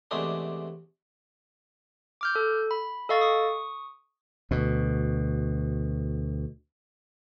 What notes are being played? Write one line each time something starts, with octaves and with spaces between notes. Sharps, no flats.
E2 C3 G#3 A3 D4
D6 F6 G6
A4
B5
A4 D#5 F5 C#6 A6
C#6 D#6
D2 B2